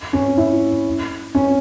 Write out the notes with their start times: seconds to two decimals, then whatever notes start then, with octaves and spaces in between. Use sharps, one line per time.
0.13 C#4
0.37 E4
1.35 C#4